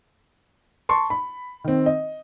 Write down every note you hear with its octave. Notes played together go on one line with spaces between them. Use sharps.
A5 C6 C#6
B5
D#3 C4
D#5